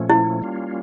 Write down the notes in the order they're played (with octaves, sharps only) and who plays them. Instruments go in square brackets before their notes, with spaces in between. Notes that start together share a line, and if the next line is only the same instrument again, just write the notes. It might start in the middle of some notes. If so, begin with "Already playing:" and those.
Already playing: [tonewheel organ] A#2 F3 A3 C#4
[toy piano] E4
[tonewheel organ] G3 A#3 C#4 F4